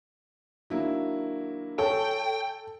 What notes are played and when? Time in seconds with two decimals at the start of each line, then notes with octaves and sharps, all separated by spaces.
0.70 D#3 F#3 A#3 D4 E4
1.79 A4 C#5 G5 G#5